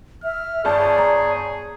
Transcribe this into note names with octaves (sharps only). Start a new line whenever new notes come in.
E5 F6
G1 G#4 D5 A5
A#5